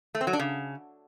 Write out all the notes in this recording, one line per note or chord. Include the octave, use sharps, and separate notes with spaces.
A3
C4
F#3
D4
C#3